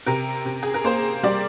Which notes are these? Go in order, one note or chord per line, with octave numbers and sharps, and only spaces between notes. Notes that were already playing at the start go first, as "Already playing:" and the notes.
C3 A#4
C3
G#4
A#4
A#3 C5
G3 D5